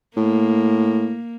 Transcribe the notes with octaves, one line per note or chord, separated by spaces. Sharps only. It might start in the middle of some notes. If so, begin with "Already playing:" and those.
A2 A#3